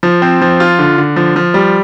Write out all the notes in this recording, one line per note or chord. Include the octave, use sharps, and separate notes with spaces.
F3
C4
F3
F4
D3
D3
F3
F3
G3